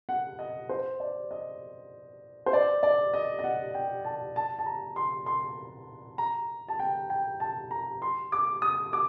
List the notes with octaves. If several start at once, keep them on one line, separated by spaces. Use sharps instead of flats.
F#5
D#5
C5
D5
D#5
C5
D5
D5
D#5
D#5
F#5
G5
A5
A5
A5
A#5
C6
C6
A#5
A5
G5
G5
A5
A#5
C6
D6
D#6
D6